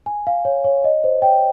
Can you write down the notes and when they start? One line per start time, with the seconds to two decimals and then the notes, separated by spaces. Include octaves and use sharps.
0.06 G#5
0.27 F5
0.45 C#5
0.64 C#5
0.84 D#5
1.04 C5
1.22 G5